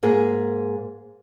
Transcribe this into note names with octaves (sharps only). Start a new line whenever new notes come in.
G#2 A#3 G#4